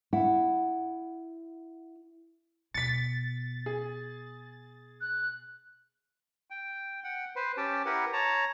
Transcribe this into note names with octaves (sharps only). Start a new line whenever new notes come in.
E4 F#5
B2 A6 B6 C#7
G#4
F#6
G5
F#5 G5
B4 C5
C#4 G4 G5 A5
E4 G4 A#4 B4 F#5
C#5 A5 A#5